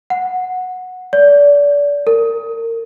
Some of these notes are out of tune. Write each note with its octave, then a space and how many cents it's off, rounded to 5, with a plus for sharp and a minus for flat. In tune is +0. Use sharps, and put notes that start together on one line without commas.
F#5 -10
D5 -30
A#4 -30